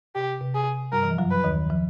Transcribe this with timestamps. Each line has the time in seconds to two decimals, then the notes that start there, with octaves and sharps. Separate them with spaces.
0.15 C3 G4
0.41 C3
0.54 G#4
0.92 G2 G3 A#4
1.03 E3
1.10 F3
1.18 F#2 F#3
1.31 B4
1.44 D#2 D#3
1.70 F3